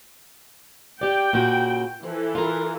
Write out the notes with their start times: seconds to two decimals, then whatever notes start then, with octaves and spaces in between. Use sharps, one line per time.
1.01 G4 D5 G5
1.33 A#2 C#3 F#4
2.03 E3 F3 A4
2.35 F4 A#4